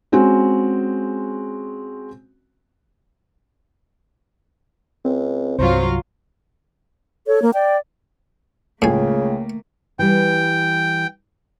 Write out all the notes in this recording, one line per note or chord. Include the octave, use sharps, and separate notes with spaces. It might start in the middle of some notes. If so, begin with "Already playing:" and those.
G#3 C4 C#4 F#4
C#2 C4
C2 G2 F#3 F4 C5
A4 C#5
A#3
D5 G5
C#2 A2 C#3 A3 A#3 G#5
E3 G3 G5